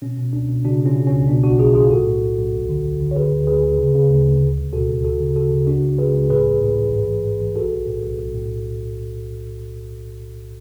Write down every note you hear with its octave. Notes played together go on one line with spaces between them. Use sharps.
B2 C#4
B2
C#2 D4
B2
C#3 D4 F#4
C#3
C#4 F4
C#3
C#2 C#4
B2 D4
B1 D4 F#4
B1 F4 G#4
B1 F4 G#4
A2 F#4 A4
A2
B1
B1
D2
D3
D2
D3
C#5
D3 G#4 B4
D2
D2 G#4 B4
D2
C#3
C#3
D2
D2
C#2
C#2
B2 F#4 A4
C#2
D2 F#4 A4
C#3
C#3 F#4 A4
C#3
C#2 D4 F#4
C#2
C#2 G#4 B4
C#2
A2 G#4 B4
A1
A2
A1
G#2
A1
G#2
A1
B1 F#4 A4
B1
A2
B1
B1
A2